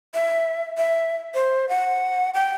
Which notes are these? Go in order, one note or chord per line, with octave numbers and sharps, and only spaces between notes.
E5
E5
C5
F#5
G5